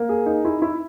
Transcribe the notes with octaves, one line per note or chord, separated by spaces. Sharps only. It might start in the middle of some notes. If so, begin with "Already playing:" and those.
Already playing: A#3
G#4
D#4
E4
E4